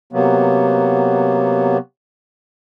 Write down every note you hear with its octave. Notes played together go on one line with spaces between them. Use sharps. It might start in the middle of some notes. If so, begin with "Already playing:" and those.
C3 F#3 A#3 B3